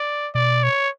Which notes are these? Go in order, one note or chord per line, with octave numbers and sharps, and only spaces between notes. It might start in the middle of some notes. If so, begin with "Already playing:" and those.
Already playing: D5
B2 D5
C#5